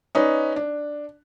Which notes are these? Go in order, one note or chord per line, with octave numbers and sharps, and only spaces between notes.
C#4 D#4 B4 D5
D4